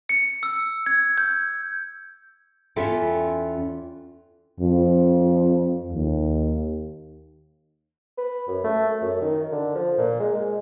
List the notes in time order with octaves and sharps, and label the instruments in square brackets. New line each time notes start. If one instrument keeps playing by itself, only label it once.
[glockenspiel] C#7
E6
G#6
G6
[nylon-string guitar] E2 C#4 F4 A4 E5 G5
[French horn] F2
D#2
[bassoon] B4
F#2
A3
F#2
D#3
D3
F3
A#2
G#3
G#3